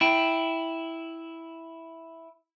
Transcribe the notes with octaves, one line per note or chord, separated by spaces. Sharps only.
E4 G5